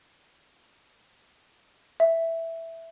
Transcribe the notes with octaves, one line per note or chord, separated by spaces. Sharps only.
E5